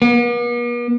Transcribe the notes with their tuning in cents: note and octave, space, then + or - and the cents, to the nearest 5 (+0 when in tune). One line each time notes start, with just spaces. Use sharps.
B3 -45